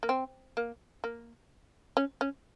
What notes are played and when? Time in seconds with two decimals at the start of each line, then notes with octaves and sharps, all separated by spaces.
0.03 A#3
0.09 C4
0.57 A#3
1.04 A#3
1.97 C#4
2.21 C#4